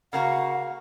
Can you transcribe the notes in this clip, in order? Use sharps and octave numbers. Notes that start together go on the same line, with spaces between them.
C#3 A#3 F#4 F#5